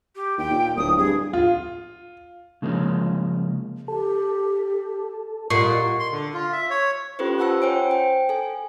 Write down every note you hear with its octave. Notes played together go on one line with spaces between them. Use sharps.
G4
D#2 G5
A#2
D1 D#6
G2 G#4
F4
C#3 F3 G#3 A#3 C#4
G4 A4
A#2 F4 G4 D#5 F#5 C#6 C7
C6
D3
F4
E5
C#5
C#4 F4 G4 A4 B4 C5
C#4 F4 F#5 A5 E6 C#7
C5 C#5 G5 G#5 D7
G5
A4 G#5